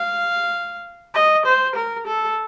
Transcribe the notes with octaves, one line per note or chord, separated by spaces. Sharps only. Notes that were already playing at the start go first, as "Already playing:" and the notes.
Already playing: F5
D#5
C5
A#4
A4